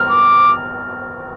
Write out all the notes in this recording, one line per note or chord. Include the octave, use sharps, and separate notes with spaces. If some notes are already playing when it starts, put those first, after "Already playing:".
Already playing: F6
D6